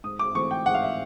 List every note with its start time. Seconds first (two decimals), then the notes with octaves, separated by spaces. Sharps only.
0.04 G#2 D#6
0.19 D6
0.35 E3 A3 C4 C#6
0.51 G5
0.66 G#2 F#5
0.74 F5
0.82 E5